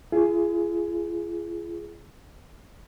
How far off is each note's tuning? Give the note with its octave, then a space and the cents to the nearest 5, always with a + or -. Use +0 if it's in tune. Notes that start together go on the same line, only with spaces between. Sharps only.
F4 -45 G#4 +10